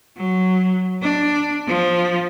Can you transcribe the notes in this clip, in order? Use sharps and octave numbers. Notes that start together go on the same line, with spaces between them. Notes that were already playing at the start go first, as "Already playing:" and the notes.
F#3
D4
F3